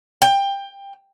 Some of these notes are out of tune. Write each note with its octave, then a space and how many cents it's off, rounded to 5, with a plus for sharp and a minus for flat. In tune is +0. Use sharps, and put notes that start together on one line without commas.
G5 +20